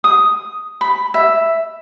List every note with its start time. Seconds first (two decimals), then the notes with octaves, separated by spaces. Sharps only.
0.04 D#6
0.81 B5
1.14 E5